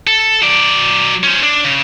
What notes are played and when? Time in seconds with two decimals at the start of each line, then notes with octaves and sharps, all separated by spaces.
0.07 A4
0.42 F#3 D5
1.23 C#4 C5
1.43 D4
1.64 C#3